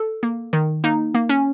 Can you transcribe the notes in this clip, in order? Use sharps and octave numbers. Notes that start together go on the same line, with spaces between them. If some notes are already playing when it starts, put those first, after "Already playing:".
Already playing: A4
A#3
D#3
A#3 D#4
A#3
C#4